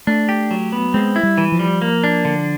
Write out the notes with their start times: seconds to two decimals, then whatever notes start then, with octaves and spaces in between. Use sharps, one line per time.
0.07 A3 D4
0.29 G4
0.51 F#3
0.72 B3
0.94 G#3 C4
1.16 E4
1.23 G3
1.38 E3
1.52 F3
1.59 G3
1.82 A#3
2.04 D4
2.25 D3